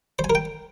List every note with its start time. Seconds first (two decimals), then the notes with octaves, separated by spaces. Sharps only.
0.19 C5
0.24 G#5
0.30 A#4
0.35 G5